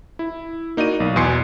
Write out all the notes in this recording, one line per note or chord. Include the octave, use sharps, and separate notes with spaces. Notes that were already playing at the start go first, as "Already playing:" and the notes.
E4
A#3 D#4 F#4 D5 D#7
B1
E2 B2 G#5 C6 C7 C#7